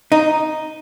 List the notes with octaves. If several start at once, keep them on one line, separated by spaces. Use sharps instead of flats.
D#4